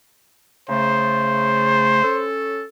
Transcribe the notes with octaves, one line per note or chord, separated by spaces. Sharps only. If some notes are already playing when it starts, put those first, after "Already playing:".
C#3 A3 C5
C#4 A4